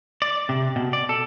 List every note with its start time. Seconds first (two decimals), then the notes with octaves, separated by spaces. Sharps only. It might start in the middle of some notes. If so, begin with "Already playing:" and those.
0.22 D5
0.49 C3
0.76 B2
0.93 D5
1.09 A4